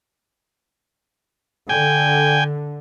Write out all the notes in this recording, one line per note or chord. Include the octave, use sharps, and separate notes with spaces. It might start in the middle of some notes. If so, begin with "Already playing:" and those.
D3 G5 G#5